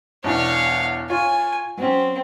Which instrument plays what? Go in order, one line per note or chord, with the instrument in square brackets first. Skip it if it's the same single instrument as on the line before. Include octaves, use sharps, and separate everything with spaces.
[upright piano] E2 B2 D4 [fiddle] C#5 F5
[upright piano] F4 C#5 [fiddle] G#5
[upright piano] F#3 C#4 [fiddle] C4